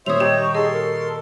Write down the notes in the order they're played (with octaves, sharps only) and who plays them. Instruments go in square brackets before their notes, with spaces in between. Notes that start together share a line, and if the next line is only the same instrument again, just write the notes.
[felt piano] A#2 D#3 G3 [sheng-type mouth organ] C5 E5 [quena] C#5 [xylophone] D#6 F7
[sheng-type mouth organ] D#4 G5 [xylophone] G4
[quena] C#6
[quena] G#4 [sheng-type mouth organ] A4 C6 [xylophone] D#5
[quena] A#4